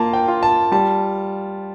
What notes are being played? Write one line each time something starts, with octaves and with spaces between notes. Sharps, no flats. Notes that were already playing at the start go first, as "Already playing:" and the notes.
Already playing: A#3 F4 A5
G5
F4
A5
G3 A5